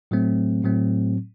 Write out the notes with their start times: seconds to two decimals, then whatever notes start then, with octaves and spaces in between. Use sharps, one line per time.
0.11 A2 F#3 A3 C4
0.64 A2 F#3 A3 C4